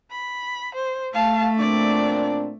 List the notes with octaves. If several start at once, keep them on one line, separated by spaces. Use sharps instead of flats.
B5
C5
A3 F5 A5
A#2 C4 D4 D5